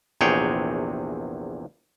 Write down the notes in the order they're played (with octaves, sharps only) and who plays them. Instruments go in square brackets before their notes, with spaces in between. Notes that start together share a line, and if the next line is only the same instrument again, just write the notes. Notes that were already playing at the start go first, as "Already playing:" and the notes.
[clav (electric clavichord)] A#1 E2 C3 G#4 C#5 G5